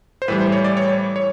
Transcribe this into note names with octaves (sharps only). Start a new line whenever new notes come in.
C5
A2 E3 G3 B4
C5
C#5
D5
C#5
C#5